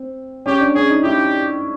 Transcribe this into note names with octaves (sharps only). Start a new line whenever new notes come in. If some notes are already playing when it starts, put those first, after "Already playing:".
Already playing: C4
C#4 G4
D4
C#4 G#4
D#4
E4 G4